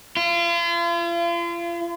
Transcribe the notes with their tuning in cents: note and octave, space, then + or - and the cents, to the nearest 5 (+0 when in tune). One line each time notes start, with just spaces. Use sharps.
F4 -40